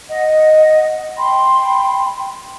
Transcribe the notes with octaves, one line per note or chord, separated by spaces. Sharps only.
D#5 F#5
G5 B5 C6